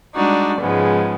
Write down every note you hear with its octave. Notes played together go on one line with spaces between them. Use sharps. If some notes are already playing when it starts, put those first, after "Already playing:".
G3 G#3 D4 D#4 F#4 D5
G#2 C#3 F3 G#3 B3